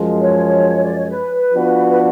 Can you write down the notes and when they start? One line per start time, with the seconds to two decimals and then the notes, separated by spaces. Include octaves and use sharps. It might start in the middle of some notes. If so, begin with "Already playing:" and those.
Already playing: F#2 F3 G#3
0.20 C#5
0.81 D5
0.95 C#5
1.09 B4
1.53 F3 B3 D4 F#4
1.89 B4